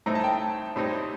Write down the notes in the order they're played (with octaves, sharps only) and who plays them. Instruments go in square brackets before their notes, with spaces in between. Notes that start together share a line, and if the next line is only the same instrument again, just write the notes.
[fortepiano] A2 A3 C4 D#4 [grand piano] A#5
[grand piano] A5
G5
A5
[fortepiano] A2 G3 C4 D#4